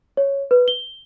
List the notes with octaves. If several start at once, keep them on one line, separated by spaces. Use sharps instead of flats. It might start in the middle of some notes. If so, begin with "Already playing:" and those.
C#5
B4
G7